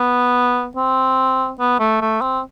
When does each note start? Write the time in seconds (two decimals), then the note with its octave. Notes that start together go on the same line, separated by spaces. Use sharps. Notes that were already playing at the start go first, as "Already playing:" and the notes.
Already playing: B3
0.76 C4
1.60 B3
1.80 A3
2.01 A3
2.22 C4